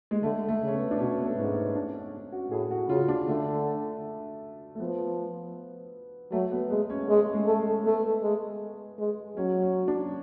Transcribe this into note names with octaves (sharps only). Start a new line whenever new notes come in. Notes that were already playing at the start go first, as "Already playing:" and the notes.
G#3
D3 A3
A3
C#3
C#4
B3
D4
B2 C#4
B3
A3
G#2 B3
C#4
D4
C#4
F#4
A2 G#4
F#4
C#3 F4
D4
D3 A3
A3
F3 B3
F#3 A3
B3
G#3 B3
C#4
G#3
G#3
A3
A3
A3 B3
G#3
G#3
F#3 C#4
C#4
D4